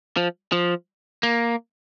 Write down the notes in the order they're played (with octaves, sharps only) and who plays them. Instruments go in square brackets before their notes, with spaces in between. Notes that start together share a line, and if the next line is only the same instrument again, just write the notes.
[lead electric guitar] F3
F3
A#3